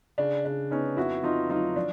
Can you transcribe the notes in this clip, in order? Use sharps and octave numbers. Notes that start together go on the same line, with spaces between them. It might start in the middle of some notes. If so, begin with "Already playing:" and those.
C#3 D4
C#3 D4
B3 C#4 D#4
F2 E4 F#4
F2 D#4 F4
F#3 D#4 F4
F3 D4